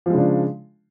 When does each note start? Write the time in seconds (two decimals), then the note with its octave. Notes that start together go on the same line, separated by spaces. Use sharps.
0.06 F3
0.10 G#3
0.14 C#3
0.18 D4